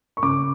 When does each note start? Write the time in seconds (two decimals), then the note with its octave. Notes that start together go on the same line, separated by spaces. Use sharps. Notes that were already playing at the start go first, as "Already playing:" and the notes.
0.17 C#6
0.23 C#3 D6